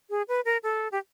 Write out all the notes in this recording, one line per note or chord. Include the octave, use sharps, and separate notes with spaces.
G#4
B4
A#4
A4
G4